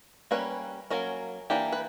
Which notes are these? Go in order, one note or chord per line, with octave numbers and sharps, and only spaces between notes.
G3 A#3 C#4 B4
F#3 A#3 C#4 A#4
E3 A#3 D4 G4
B4